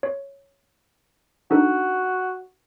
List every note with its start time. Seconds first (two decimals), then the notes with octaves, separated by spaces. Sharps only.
0.03 C#5
1.51 D4 D#4 F#4 A4